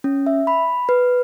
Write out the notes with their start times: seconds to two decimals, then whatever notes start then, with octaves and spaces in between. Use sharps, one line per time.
0.04 C#4
0.27 E5
0.47 B5
0.89 B4